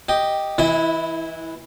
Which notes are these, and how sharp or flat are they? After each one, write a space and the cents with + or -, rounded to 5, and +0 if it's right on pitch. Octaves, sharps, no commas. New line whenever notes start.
G4 +0 D#5 +0
E3 -20 E4 +0 D#5 +45